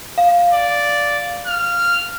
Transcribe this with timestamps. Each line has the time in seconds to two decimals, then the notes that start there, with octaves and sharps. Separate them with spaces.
0.18 F5
0.53 D5
1.47 F6